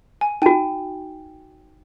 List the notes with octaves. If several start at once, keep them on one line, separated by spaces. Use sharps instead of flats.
G#5
D#4 F#4 G5 G#5